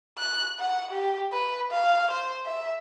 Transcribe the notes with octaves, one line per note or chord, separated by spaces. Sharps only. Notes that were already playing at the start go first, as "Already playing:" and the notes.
F#6
F#5
G4
B4
F5
C5
E5